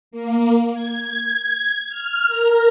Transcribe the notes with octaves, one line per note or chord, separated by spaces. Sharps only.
A#3
G#6
F6
A#4